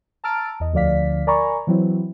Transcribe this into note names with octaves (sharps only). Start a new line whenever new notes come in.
A5 A#5 E6 F6 A6 D7
E2 D#5
D2 D3 F3 D5 F5 B6
A#4 D5 G#5 A#5 B5 C#6
E3 F#3 C4 E4